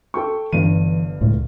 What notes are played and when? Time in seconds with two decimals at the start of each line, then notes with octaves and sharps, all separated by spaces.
0.14 A4 G5 C#6
0.53 G1 G2 E3 D#7
1.21 C#2 A2